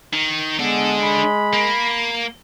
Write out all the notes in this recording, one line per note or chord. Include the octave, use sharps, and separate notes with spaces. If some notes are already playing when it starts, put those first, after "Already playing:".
D#3
G#3 B3 D4 A4
B5
A#3